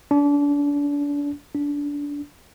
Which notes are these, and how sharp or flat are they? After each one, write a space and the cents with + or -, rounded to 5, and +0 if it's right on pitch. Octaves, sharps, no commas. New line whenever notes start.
D4 -35
D4 -25